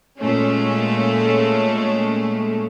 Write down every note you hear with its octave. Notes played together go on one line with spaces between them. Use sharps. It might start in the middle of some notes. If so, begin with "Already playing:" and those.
A#2 G#3 A3 C#4